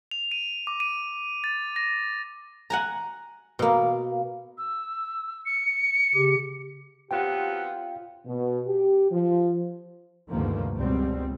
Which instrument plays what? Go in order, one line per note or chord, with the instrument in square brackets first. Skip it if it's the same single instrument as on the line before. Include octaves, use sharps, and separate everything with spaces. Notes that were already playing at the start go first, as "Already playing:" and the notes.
[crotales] F7
D#7
D6
D#7
A6
A#6
[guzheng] F#5 G#5 A#5
B2 A#3
[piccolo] E6
C#7
[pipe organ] C#3 G4
[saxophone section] F3 F#3 B3 [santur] C4 F4 [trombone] G4 [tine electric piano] G5
[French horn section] B2
G4
F3
[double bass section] D2 G2 C3 D#3 F3 A#3
C#2 B2 G3 C4